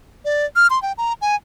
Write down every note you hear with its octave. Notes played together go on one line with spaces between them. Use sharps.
D5
F6
C6
G5
A#5
G#5